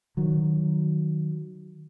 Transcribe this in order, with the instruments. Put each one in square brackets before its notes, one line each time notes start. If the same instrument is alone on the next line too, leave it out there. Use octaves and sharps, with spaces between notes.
[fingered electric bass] D#3 F#3